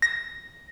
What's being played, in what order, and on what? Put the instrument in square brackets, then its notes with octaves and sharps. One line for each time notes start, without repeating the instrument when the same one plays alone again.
[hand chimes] A#6